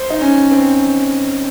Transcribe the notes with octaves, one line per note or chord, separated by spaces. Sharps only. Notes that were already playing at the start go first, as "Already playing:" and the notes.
Already playing: C5
D#4
C#4
C4